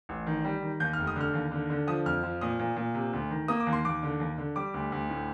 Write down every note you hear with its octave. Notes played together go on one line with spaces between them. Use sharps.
A1
D#3
G3
D#3
D#2 G6
F1 F6
D#6
D3 F6
D#2
D3
D3
F3 D#6
F2 F6
F3
A#2 D#6
A#2
A#2
C3
D2
D#3
A#3 D#6
D6
D#2
C6
D#2 D6
D3
D#2
D3
G3 D6
D2
D2
A2